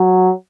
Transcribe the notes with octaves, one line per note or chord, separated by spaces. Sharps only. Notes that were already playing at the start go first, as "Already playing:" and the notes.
Already playing: F#3